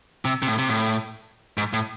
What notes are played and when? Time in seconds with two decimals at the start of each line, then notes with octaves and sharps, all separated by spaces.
0.25 C3
0.42 C3
0.47 A2
0.58 C3
0.69 A2
1.58 G#2
1.73 A2